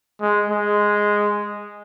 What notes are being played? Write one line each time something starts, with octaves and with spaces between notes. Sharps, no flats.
G#3
G#3